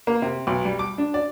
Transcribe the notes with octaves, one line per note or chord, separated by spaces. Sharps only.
A#3
C3
B1
G3
D6
D4
D5